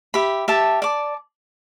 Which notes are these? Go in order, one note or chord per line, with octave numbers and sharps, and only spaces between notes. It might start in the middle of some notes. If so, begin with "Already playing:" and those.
G4 E5 B5
G4 E5 A5
D5 A5 D6